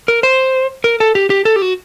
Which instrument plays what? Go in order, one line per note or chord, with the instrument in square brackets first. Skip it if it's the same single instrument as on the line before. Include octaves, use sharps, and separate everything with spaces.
[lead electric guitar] A#4
C5
A#4
A4
G4
G4
A4
G4
F#4